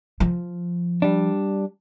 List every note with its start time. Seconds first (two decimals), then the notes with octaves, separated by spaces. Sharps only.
0.20 F3
1.02 G3 D4